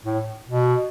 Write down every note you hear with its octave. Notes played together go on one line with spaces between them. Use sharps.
A2
B2